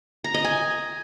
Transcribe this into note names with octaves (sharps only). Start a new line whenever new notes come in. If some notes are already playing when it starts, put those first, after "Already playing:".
A#5
D#5
G#5